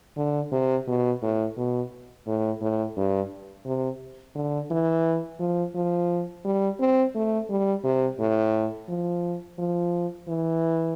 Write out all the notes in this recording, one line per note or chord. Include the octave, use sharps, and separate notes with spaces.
D3
C3
B2
A2
B2
A2
A2
G2
C3
D3
E3
F3
F3
G3
C4
A3
G3
C3
A2
F3
F3
E3